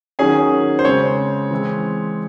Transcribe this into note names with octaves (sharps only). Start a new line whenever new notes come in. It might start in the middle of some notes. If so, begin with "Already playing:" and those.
D#3 F#3 C#4 G#4 G#5
C5
C#3 G#3 C4 C#5
E3 G#3 C4